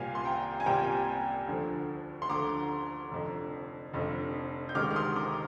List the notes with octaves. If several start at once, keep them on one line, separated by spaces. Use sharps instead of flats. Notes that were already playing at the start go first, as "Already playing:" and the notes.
Already playing: C2 A#2 G3 C4 F5 G#5
C6
G5 A#5
G#5
C2 A#2 G3 C4 G5 A#5
D2 D3 F3
C6
D2 D3 F3 A#5 D6
F1 F2 D3
F1 F2 D3
G6
D2 C3 D#3 G#3 D6 F6
F6
C6 D#6
A#5 D6